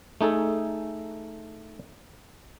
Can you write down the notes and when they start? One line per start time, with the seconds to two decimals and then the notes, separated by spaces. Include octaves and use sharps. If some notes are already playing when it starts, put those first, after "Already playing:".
0.21 A3 D#4 G#4 A4